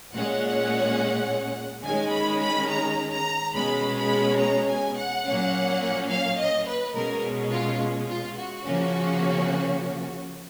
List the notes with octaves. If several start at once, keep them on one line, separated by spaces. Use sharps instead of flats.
A#2 G#3 C#4 F#5
D#3 G#3 C#4 G#5
B5
B5
A#5
A#5
B2 G#3 C#4 B5
B5
A#5
G#5
F#5
A#2 F#3 A#3 C#4
F5
D#5
B4
B2 G#3 C#4 A#4
F4
F4
F#4
C#3 F3 A#3 C#4